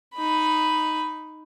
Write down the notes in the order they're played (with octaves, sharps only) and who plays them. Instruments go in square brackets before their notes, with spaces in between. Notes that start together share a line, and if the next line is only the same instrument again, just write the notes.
[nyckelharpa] D#4 B5